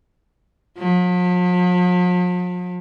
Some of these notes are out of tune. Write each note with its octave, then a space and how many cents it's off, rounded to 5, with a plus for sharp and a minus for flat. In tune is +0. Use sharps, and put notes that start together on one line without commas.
F3 +45